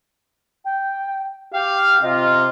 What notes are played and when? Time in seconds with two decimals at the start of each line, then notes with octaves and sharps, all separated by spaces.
0.65 G5
1.54 G4 F5 G5
2.02 C3 F4 D#5